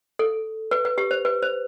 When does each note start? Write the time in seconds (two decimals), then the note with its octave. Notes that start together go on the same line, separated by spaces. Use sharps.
0.19 A4
0.71 B4
0.85 B4
0.98 G4
1.11 C5
1.25 B4
1.42 C5